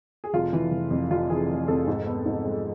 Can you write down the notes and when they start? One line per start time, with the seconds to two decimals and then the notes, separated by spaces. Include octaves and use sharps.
0.24 G#4
0.33 F1 F4
0.53 E3
0.72 F1
0.91 F2
1.10 F1 F4
1.29 E3 G#4
1.49 F1
1.68 F2 A4
1.88 G#2
2.06 B3
2.26 G#2
2.45 G#3